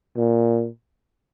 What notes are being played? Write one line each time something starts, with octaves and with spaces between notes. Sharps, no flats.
A#2